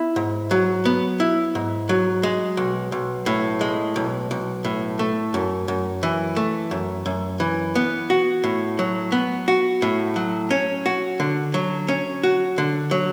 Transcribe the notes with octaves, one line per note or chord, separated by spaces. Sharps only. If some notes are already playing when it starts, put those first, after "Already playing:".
Already playing: B3 E4
G#2
F#3
B3
E4
G#2
F#3
G#3
B1
B1
A2
G#3
B1
B1
A2
A3
F#2
F#2
E3
A3
F#2
F#2
E3
B3
F#4
A2
F#3
B3
F#4
A2
F#3
C#4
F#4
D3
F#3
C#4
F#4
D3
F#3